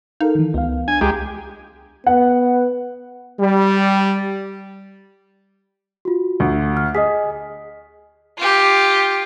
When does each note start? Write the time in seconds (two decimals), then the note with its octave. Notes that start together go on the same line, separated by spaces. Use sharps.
0.21 D#4 A4 A#4 F5
0.35 D#3 E3
0.54 C#2 B3 F5
0.88 D4 G#5
1.01 C#2 G#3 G4 A#5
2.07 B3 F#5
3.40 G3
6.05 F4 F#4
6.40 D2
6.77 F6
6.95 G#4 D#5 D#6 B6
8.38 F4 G4